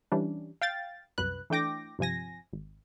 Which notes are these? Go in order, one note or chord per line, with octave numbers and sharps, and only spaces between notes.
E3 G3 C#4 D4
F5 G5 A6
C2 F#2 B4 F#6
E3 A3 D4 G5 D6 A#6
G1 C3 F3 G#5 A#6
G#1